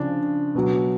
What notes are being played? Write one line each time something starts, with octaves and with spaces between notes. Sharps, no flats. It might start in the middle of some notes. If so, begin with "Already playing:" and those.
Already playing: C#3 F3 D4
B2 F#3